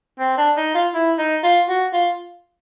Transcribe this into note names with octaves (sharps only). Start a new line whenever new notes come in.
C4
D4
D#4
F4
E4
D#4
F4
F#4
F4